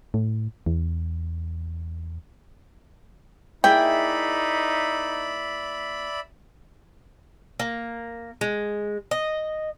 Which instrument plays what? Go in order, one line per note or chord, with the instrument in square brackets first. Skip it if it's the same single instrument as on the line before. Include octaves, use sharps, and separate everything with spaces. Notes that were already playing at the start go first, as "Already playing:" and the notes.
[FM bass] A2
E2
[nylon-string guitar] A#3 E4 G#4 [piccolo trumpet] D#4 [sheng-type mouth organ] D5 E5 B5 [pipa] G5
[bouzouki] A#3
G#3
D#5